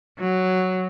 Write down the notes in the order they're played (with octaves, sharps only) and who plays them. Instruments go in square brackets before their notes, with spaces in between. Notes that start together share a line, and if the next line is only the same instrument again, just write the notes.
[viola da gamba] F#3